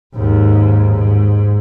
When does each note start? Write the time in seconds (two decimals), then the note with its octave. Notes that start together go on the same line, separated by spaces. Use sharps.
0.15 D#2 G#2
0.94 G#2